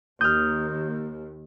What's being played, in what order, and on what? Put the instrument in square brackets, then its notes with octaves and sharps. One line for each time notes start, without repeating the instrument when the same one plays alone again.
[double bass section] D#2 [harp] D#6 F6 [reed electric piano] G6